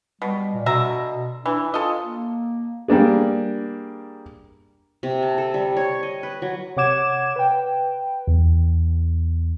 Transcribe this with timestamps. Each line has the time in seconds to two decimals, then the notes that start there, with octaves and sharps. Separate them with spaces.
0.22 B2 G3
0.54 A#2
0.66 B2 D3 E5 A#5
1.46 E3 D4
1.74 F4 A4 D#5
2.03 A#3
2.88 G3 A#3 D4 G#4
5.03 C3
5.23 A5
5.38 A4
5.54 G3
5.77 C#5
6.03 D#5
6.23 B4
6.42 F#3
6.77 C3 C#5 F#5 D6 G#6 E7
7.36 B4 G5
8.27 E2